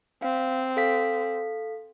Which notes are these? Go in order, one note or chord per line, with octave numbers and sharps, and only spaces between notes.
C4 F5
A4 F5 B6